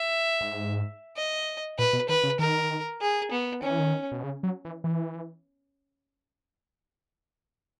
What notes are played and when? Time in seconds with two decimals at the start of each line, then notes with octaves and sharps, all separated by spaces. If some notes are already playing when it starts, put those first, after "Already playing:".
Already playing: E5
0.41 G#2
1.17 D#5
1.78 A#2 B4
1.93 B2
2.09 D#3 B4
2.24 C#3
2.39 D#3 A#4
3.01 G#4
3.31 B3
3.62 D#3 C#4
3.71 E3
3.80 D#3
4.11 B2
4.24 C#3
4.43 F#3
4.65 E3
4.84 E3